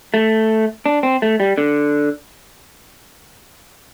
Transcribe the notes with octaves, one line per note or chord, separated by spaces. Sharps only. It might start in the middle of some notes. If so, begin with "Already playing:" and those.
A3
D4
C4
A3
G3
D3